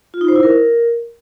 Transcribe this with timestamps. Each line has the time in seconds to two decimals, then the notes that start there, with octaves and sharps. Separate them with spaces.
0.14 F4
0.21 D#4
0.28 C5
0.36 E4
0.43 A#4